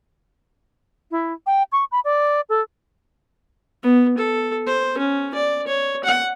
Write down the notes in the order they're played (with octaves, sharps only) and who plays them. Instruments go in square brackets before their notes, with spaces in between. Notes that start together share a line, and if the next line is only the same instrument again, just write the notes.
[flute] E4
G5
C#6
B5
D5
A4
[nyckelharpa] B3
A4
C5
C#4
D5
C#5
F#5